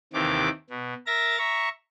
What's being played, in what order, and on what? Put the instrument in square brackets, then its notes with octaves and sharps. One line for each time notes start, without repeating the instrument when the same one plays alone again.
[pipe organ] D#2 C3 D#3 E3 D6
B2
A#4 E5 A#5 A6 A#6
E5 A#5 C#6